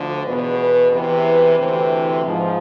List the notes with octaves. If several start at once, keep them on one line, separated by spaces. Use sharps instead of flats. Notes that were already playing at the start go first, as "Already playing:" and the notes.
Already playing: D2 D3 F3
E2 B2 B4
B4
E2 C3 E3 B4
D2 C3 E3 C5
G#2 F3